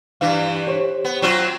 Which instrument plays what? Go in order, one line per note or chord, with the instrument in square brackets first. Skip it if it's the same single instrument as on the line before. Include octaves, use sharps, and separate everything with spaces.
[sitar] G2 E3 [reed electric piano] F5
[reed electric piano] G4 C5 C#5
[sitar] B3
F#3 C4 F4